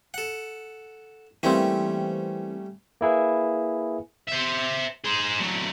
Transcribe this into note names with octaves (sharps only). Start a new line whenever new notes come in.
A4 F#5
E3 G3 A3 A#3 C4 C#4
A#3 E4 G#4 B4
C5 E5
G#4 C5
F#3 A3